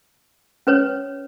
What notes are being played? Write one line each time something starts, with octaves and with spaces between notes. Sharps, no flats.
C#4 B4 C#5